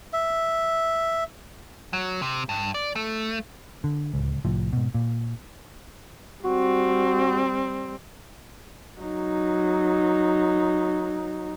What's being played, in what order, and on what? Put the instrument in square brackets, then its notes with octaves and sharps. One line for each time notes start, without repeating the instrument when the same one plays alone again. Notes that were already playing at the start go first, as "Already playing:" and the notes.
[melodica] E5
[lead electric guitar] F#3
C3
G2
D5
A3
[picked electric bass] D3
D1 C#2
C2 A2 F3
G#2 B2
A#2
[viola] G3 C4 [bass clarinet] F#4
[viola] F#3 D#4